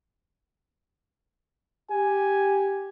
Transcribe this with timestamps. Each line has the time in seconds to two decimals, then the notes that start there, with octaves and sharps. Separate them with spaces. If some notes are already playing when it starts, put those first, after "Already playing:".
1.91 G4 G#5